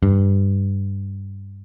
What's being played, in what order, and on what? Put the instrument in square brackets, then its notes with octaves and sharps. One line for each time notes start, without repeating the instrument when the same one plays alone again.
[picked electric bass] G2